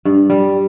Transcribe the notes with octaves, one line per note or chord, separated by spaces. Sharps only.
G2
G3